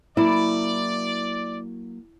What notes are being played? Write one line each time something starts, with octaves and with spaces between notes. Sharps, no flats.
F#3 A#3 E4 D5